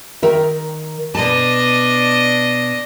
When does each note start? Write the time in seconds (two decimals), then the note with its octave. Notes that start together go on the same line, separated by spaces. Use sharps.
0.22 D#3 A#4 E5
1.15 B2 D4 D#5 A5